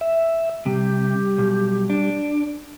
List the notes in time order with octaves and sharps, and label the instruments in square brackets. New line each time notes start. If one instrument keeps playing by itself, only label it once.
[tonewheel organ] E5
[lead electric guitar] C3 [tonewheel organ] G3 [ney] G4
[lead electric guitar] B1
D4